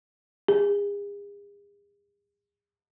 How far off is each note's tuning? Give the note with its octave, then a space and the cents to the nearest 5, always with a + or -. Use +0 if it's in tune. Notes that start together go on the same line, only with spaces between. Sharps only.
G#4 -40